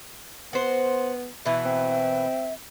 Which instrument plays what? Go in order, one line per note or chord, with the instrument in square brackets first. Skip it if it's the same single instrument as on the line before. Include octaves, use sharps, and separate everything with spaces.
[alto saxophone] B3 [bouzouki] F#4 C5
[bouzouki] B2 E3 [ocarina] E5
[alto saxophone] C4